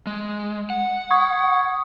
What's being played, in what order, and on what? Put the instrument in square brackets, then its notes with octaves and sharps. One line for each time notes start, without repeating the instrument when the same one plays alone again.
[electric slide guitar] G#3
F#5
[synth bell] C#6 D#6 G#6